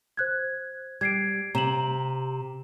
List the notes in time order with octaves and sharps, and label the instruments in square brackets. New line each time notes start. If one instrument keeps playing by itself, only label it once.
[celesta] C5 F#6 G#6
[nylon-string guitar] G3 [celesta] G#6 C7 D7
[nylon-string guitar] C3 [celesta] A#5 E7 F#7